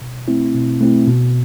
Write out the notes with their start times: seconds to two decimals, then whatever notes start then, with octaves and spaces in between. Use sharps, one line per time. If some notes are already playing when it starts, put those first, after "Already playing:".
0.01 B2
0.28 A3 C4 E4
0.55 B2
0.81 A3 C4 E4
1.07 B2